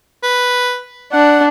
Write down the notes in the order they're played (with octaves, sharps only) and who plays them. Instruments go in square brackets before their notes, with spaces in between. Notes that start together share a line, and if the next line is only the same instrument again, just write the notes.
[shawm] B4
[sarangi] D4 [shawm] F#5